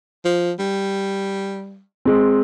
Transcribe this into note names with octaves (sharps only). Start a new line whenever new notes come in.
F3
G3
G#3 C4